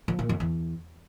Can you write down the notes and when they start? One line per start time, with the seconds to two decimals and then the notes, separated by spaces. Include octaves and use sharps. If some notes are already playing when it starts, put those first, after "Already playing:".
0.08 F3
0.19 A#2
0.29 F2
0.40 E2